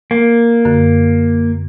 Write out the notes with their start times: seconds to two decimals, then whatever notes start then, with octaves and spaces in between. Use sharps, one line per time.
0.11 A#3
0.65 F#2 D3